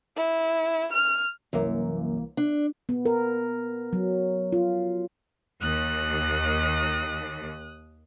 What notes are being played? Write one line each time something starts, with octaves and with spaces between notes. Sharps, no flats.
E4
F6
C2 F#2 E3 A#3
D4
B3
A#4
F#3
F4
D#2 D#6 F#6